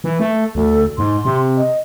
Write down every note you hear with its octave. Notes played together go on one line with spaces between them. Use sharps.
E3
A3
D2 A4
G#2 C6
C3
D#5